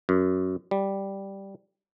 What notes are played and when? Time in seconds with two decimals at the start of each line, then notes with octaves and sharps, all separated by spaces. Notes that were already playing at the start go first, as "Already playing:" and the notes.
0.09 F#2
0.71 G3